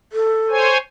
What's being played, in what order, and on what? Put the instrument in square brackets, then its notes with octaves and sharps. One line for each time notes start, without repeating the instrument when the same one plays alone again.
[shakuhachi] A4
[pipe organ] C5 C#5 G#5